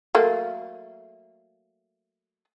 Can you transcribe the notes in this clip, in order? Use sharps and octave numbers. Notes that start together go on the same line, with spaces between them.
F#3 A3 A#3